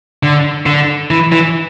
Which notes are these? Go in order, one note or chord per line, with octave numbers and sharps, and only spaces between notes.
D3
D3
E3
E3